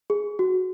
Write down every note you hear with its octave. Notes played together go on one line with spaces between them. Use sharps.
G#4
F#4